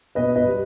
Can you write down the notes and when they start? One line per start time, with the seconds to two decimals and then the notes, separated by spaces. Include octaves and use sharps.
0.15 B2 B4 D#5
0.36 B4 D#5
0.46 G3